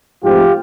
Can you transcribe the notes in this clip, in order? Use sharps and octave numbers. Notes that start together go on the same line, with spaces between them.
G#2 F3 A3 C4 F4 G4